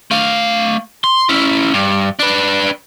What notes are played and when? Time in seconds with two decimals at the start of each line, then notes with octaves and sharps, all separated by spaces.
0.11 A3 F5
1.04 C6
1.29 C#4 E4
1.74 G2
2.19 D4 B4